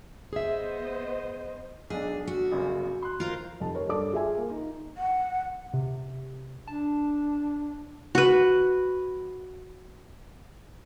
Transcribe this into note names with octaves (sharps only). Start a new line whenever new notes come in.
B3 G#4 C5 D#5 E5
B1 D4 G#4
F#4
G1 F#2 C#3
C6 F#6
F4 A#4 C5
F1 A5
G4 A#4 C#5
G2 A4 D5 A5 D6
F4 G#4 E5 G#5
A#3
D#4
F#5
C3
D4 A5
F#4 B4